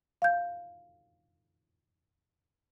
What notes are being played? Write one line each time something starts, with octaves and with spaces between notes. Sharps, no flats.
F5 G6